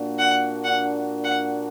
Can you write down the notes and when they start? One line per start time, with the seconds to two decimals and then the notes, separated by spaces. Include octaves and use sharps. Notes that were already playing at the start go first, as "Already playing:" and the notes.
Already playing: A#2 A#3 D4 F#4
0.19 F#5
0.64 F#5
1.24 F#5